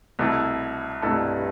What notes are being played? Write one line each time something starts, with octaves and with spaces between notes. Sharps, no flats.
C2 B2 A3 E4 A4
C2 G2 B2 A3 E4 A4